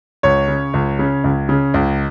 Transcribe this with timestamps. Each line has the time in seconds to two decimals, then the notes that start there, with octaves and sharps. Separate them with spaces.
0.23 C#2 C#5
0.48 C#3
0.74 C#2
0.99 C#3
1.24 C#2
1.49 C#3
1.74 C#2